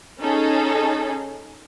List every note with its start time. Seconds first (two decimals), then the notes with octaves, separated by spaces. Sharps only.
0.22 C#4 D#4 G#4 A4